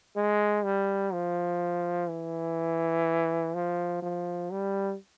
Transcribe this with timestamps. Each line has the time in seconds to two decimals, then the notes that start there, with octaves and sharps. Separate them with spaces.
0.16 G#3
0.64 G3
1.13 F3
2.09 E3
3.54 F3
4.02 F3
4.51 G3